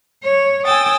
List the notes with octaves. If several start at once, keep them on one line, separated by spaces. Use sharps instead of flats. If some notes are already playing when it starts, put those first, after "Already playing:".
C#5
G5 G#5 D#6 E6 A6